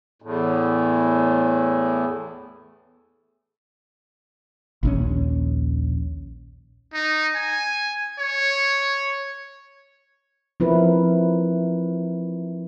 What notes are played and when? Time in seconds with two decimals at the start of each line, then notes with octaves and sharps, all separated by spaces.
0.22 E2 A2
4.83 A#1 D#2 C#4
6.94 D#4
7.35 G#5
8.19 C#5
10.60 F3 C4 E4 A#4 B4